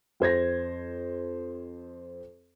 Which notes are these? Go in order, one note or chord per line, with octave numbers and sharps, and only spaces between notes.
F2 C5 G#6 A#6